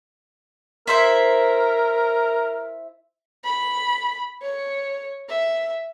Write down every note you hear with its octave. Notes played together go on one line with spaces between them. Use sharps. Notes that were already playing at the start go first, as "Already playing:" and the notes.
E4 A#4 C5 E5
B5
C#5
E5